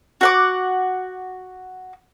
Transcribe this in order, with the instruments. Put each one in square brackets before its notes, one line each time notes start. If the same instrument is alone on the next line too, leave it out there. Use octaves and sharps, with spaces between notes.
[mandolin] F#4 F#5 D6